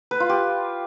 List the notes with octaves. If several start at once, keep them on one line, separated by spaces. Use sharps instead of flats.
B4
F4
G4